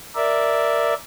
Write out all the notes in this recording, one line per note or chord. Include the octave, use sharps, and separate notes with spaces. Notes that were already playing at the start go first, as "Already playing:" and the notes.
A#4 D5 E5